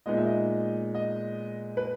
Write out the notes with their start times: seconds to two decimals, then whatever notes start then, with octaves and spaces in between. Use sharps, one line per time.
0.06 A#2 G#3 B3 D#4 D#5
0.17 E5
0.26 D#5
0.95 D#5
1.77 B4